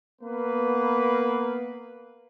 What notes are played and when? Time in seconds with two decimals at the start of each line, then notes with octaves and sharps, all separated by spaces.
0.22 A#3 B3 B4